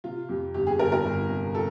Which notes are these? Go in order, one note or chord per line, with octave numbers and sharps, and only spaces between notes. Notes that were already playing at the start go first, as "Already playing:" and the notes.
C3 F4
F2 G4
G1 G4
G#4
G1 A#4
A#4
G1
C3
A4